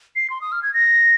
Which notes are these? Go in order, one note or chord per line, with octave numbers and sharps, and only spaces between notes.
C7
C6
D#6
F6
G#6
A#6